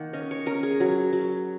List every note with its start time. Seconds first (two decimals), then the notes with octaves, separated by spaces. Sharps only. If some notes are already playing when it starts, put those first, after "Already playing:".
Already playing: D#3 A#3 F#5
0.13 C#4 D#5
0.31 C#5
0.46 C#4 A#4
0.63 G#4
0.80 F#3
1.13 F#3